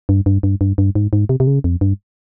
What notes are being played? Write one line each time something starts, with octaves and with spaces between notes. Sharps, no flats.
G2
G2
G2
G2
G2
G#2
G#2
C3
C3
C#3
F2
G2